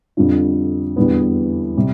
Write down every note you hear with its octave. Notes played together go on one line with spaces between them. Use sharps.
F2 D3 G3 D4 F4
E2 D3 G3 B3
C3 G3